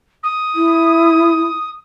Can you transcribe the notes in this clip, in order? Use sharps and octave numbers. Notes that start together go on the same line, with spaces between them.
D#6
E4